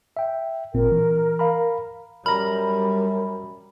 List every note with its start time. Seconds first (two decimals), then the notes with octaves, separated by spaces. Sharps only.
0.17 E5 G5
0.74 G#1 A#2 C4 A#4
0.92 E3
1.39 F5 A#5 B5
2.26 F#2 G3 A#5 B5 F6